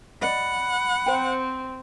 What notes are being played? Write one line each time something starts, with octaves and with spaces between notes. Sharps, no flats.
D5 D#5 F#5 B5
C4 C5 G5